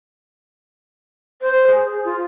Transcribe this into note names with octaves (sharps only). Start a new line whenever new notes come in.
C5
G#4
F4